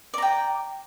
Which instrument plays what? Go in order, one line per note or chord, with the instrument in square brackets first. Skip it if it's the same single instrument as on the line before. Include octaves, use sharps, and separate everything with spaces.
[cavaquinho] D5
A#5
G5